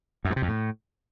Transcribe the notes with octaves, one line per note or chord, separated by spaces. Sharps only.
F#2
G2
C3
F2
A2